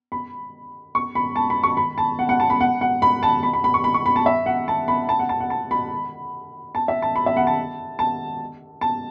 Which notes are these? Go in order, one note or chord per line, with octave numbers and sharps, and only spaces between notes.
B5
C#6
B5
A5
B5
C#6
B5
A5
F#5
F#5
A5
B5
F#5
F#5
B5
A5
B5
B5
B5
C#6
B5
C#6
B5
A5
E5
F#5
A5
B5
A5
F#5
A5
F#5
A5
B5
A5
E5
A5
B5
E5
F#5
A5
A5
A5